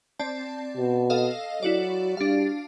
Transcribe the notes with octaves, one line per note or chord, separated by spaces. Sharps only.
C4 D5 A5
B2
A4 D#5 F5
F#3 E4 F#4 D5
G3 D4 F5